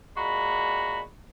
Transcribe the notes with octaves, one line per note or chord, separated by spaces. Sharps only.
A#2 G#3 F#4 A#5 B5